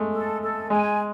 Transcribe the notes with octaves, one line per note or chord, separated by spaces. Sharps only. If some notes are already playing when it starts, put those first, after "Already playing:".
Already playing: G#3 A3
A4
A4
G#3 G#5